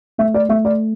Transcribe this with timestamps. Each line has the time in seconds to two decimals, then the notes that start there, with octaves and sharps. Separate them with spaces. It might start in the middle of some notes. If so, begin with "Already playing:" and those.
0.18 A3 E5
0.34 D5
0.49 A3 E5
0.65 D5